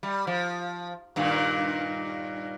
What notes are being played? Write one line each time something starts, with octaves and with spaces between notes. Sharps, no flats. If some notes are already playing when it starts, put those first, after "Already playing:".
G3
F3
G2 A#2 D#3